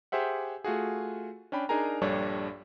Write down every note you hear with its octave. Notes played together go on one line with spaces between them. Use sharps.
G4 G#4 C5 E5 F#5
A3 F4 F#4 G#4
C#4 D4 G5 B5
D4 D#4 G#4 A#4 G#5 A#5
A#1 G2 G3 D4 A4 C#5